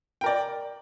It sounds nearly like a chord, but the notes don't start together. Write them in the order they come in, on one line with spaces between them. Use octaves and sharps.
G5 A#4 D5